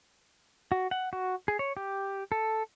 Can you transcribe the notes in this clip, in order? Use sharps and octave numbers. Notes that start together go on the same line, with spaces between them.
F#4
F#5
F#4
G#4
C#5
G4
A4